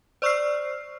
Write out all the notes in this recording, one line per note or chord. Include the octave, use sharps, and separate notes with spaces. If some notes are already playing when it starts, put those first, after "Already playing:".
C5 D5 C#6 E6 F6 C7